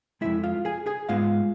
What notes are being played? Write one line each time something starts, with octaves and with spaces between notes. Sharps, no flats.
F2 C3 G#3 E4 E5
F4 F5
G#4 G#5
G#4 G#5
G#2 G#3 B3 F4 F5